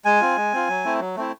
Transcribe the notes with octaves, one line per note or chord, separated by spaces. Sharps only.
G#3 G#5
C4 F4
G#3
C4 F4
F#3
A3 C4 E4
F#3
A3 C4 E4